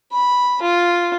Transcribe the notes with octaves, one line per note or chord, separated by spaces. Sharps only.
B5
F4